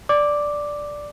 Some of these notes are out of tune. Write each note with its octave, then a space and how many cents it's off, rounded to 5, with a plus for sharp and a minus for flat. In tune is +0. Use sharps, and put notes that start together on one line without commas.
D5 +0 D6 +0